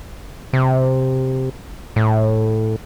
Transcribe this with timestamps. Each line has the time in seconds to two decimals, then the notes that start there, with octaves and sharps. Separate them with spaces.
0.53 C3
1.96 A2